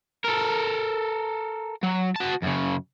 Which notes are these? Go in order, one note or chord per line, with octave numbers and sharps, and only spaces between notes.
A4 A#4
F#3
F#4 A5
F#2 C#3